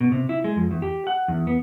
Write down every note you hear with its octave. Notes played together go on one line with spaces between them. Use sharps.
B2
C3
E4
G#3
F2
E2
G4
F#5
E2
B3